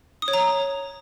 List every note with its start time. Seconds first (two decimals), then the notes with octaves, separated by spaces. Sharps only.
0.22 D#6
0.28 C#5
0.33 A#5